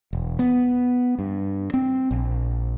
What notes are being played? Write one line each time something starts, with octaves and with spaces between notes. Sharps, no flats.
E1
B3
G2
C4
A#1